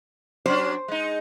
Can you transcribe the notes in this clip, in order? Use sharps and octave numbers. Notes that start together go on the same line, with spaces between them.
F#3 C#4 D4 C5
G#3 D#4